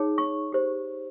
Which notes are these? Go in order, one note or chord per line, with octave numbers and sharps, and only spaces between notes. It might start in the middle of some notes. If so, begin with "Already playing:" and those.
Already playing: D#4 G#4 C#5
C#6
G4 C5